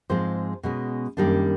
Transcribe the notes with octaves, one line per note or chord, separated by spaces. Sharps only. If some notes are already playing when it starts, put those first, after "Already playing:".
G#2 F3 G#3 C4 C5
B2 G#3 C#4
F#2 D#3 G3 A#3 D4